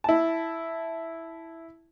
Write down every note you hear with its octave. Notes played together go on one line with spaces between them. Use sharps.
E4 A5